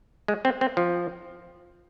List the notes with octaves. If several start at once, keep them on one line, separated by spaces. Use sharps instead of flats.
G#3
C4
C4
F3